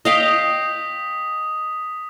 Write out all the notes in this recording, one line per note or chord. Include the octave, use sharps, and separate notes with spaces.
D#5 F5 G5 D#6 B6